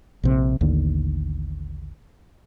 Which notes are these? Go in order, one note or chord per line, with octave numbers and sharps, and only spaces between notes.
A#1 C3
A1 D#2 D3